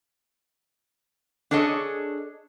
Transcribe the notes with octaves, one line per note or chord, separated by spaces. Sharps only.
D4 G#4 A4 C#5 D#5